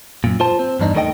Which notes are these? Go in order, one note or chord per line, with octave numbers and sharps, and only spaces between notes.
F#2 A#2
F4 C5 A5
C4
E2 G2 D4 D#4
D#2 D#3 A3 A#4 D#5 G5